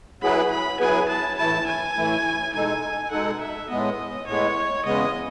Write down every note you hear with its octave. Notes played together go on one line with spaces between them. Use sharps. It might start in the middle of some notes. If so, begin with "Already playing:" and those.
F#3 B3 E4 G#4 B4 B5
B5
F#3 B3 E4 G#4 B4 G#5
A5
A2 E3 A3 E4 A5
G#5
A2 E3 A3 E4
B2 G#3 D#4 A4 G#5
B2 G#3 D#4 A4 F#5
E5
A2 G#3 B3 D#5
A2 G#3 B3 C#5
E2 C#3 G#3 B3 D#5